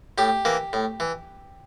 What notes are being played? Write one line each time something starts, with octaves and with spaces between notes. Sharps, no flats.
A2 G4
E3 A#3
A2
E3